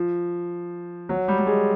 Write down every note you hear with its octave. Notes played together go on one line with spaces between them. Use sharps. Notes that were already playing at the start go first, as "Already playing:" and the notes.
Already playing: F3
F#3
G3
G3
G#3